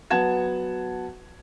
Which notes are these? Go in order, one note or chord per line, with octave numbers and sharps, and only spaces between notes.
F#3 B3 F#5 A5 G#6 E7